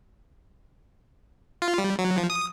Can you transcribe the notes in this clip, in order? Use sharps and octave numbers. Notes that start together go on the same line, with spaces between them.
F4
G3
F#3
F3
D#6